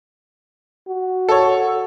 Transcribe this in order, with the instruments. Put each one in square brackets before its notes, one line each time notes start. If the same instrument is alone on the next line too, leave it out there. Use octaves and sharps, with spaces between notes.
[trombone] F#4
[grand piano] A4 C#5